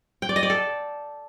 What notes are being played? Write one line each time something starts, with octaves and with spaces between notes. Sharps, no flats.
G5
D5
D#5
D5
A4